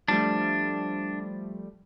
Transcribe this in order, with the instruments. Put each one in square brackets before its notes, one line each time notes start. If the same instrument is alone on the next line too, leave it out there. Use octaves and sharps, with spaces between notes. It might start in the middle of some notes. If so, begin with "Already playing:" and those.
[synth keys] F3 G3 A3 [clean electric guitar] D4